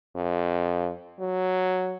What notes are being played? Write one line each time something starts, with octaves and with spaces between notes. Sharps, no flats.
F2
F#3